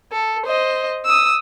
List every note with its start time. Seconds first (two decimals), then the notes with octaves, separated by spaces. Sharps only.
0.12 A4
0.46 C5 D#5
1.06 D#6 E6